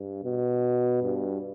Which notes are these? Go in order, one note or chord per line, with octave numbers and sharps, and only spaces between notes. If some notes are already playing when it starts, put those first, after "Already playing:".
Already playing: G2
B2
G2